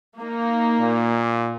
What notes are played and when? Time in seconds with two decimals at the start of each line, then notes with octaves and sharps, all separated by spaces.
0.19 A#3 D#4
0.80 A#2